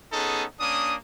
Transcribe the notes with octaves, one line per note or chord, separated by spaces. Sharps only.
B3 C#4 D#4 G#4 A4
A#3 C#4 D4 D#6